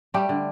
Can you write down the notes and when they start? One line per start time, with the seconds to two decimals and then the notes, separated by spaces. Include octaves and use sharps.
0.14 G3 A3 G4
0.29 D3